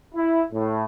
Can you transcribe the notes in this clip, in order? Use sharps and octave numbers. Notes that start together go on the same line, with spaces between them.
E4
A2